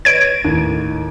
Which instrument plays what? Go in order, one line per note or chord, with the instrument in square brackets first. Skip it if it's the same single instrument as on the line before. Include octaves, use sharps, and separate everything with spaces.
[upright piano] B4 C#5 D#5 [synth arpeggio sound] G#6 D7
[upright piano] D#2 A2